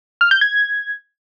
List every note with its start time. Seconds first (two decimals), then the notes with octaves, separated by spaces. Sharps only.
0.21 F6
0.31 G6
0.41 G#6